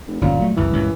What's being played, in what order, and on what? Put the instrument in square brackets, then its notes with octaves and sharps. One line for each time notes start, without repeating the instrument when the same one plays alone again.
[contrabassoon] F1
[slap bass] G1 F2 C#4 [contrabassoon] A#2
[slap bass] F#3 A3
[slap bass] F#1 C2 F#2 [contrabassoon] E3
[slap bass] C#2 G2 A#2